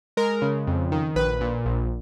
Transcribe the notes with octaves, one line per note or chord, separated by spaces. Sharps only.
G#3 A#4
C#3
F2
D#3
A#1 B4
A#2
A#1